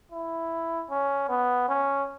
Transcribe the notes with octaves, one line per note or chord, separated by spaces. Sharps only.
E4
C#4
B3
C#4